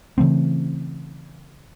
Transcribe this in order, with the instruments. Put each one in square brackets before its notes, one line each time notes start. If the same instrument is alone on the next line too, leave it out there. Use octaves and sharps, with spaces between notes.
[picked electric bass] C#3 E3 A3 C4